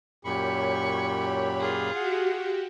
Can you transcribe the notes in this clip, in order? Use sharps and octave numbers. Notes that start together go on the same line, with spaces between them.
F#2 A#2 G4 C#5 B5 C#6
F4 G#4
F#4 G4 F#5